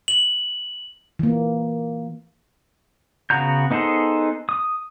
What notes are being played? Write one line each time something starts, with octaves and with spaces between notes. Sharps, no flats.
F#7
E3 A#3
C#3 B3 F#4 A#5 G6
B3 D#4 G#4 A4 C5
D#6